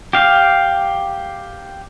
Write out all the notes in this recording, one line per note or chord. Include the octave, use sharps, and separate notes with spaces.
G4 F5